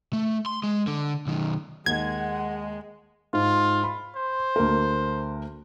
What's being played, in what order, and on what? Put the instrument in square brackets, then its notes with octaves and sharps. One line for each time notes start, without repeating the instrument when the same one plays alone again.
[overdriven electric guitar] A3
C6
G#3
D3
B1 D#3
[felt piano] D#2 [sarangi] G#3 [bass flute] F#5 [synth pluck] G#6
[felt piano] G#2 [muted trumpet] F4
[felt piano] B5
[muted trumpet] C5
[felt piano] D2 A#4